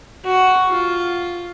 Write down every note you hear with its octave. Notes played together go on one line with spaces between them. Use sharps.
F#4
F4